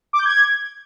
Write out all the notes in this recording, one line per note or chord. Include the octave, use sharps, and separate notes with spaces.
D6
G6
G#6